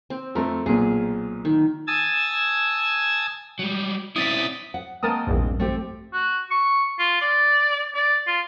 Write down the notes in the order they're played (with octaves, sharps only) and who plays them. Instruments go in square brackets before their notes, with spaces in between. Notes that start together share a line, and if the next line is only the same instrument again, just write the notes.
[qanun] C4
[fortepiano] F2 A3 [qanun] A#4
[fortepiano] B1 A#2 [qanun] G#4
[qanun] D#3
[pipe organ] G#5 A5 D#6 E6 G#6 A6
[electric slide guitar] F#3 G3
[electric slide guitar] C4 C#4 E4 [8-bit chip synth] D#6 A6 B6
[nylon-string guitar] F#5
[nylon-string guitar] G#3 A#3 C4 [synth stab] A#4 A5 D#6
[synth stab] A#1 E2 G2
[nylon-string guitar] A3 C4 G4
[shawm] F#4
C#6
F4
D5
D5
F4